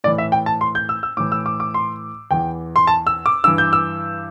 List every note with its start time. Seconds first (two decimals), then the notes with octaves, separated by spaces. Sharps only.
0.04 A2 D5
0.07 E3
0.18 E5
0.32 G5
0.46 A5
0.61 C6
0.75 G6
0.89 E6
1.03 E6
1.17 A2 D6
1.20 E3
1.32 E6
1.46 D6
1.60 D6
1.74 C6
2.31 E2 E3 G5
2.76 C6
2.87 A5
3.07 E6
3.26 D6
3.44 G2 E6
3.47 E3
3.58 G6
3.73 E6